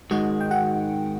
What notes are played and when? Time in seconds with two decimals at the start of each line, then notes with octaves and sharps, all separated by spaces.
0.11 G#2 D#3 G#3 F#4 F#5
0.41 G5
0.51 F#4 F#5